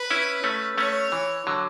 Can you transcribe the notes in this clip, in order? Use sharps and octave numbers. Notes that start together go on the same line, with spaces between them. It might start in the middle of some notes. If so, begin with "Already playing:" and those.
Already playing: B4
C#4 E4
A3 C#4
A3 C#4 C#5
E3
D3 F#3